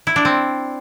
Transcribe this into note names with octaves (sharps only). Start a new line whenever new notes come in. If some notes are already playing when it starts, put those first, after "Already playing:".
E4
D4
C4